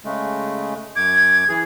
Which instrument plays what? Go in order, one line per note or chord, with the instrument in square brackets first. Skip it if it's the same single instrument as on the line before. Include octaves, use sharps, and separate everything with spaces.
[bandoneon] C#3 G#3 A3
[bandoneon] F#2 D6 [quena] G#6
[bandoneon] E3 G#4